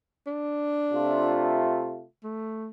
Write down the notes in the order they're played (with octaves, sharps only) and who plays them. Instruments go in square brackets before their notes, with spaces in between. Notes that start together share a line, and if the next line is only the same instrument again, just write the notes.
[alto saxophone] D4
[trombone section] C3 A3 F4
[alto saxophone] A3